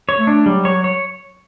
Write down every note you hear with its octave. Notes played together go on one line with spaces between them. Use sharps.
C#5
A3
D4
F#3 G3
C#5
C#5